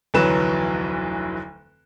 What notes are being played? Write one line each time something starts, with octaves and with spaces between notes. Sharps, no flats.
F1 D2 E3 F#3 B4 E7